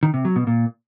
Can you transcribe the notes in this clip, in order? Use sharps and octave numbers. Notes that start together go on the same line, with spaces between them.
D#3
C3
F#3
B2
A#2